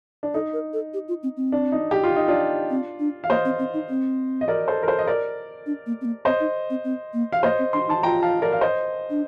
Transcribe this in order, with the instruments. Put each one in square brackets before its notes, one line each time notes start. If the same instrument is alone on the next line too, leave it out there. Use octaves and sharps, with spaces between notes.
[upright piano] D4
[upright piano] D#4 [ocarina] A4
[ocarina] A#4
A4
G4
F4
C4
C4
[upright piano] D4
D#4
G4
F4
D#4
D4 F4
[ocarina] C4
D4
[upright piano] F5
[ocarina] A#3 [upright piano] C5 D#5
[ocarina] C4
C4
D#4
C4
[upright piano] D#5
A#4 D5
A4 C5
A#4
A4 C5
D#5
A#4 D5
[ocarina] D4
A#3
C4
A#3
[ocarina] C4 [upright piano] C5 D#5
[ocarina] D#4
C4
C4
A#3
[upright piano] F5
[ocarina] A#3 [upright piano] C5 D#5
[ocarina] C4
[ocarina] D4 [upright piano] C6
[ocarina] D#4 [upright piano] A5 C6
[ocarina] F4 [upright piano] G5 A#5
[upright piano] F5 A5
A#4 D5
F5
C5 D#5
[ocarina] D4